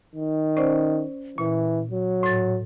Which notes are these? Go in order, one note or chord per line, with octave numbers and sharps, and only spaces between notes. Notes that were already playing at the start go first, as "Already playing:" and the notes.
D#3
C#4 C5 D5
A#2 E3
F#3
A2 A6